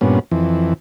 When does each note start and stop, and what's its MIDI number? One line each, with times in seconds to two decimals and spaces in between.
0.01 0.19 43
0.01 0.19 46
0.01 0.19 59
0.01 0.19 61
0.31 0.73 41
0.31 0.73 52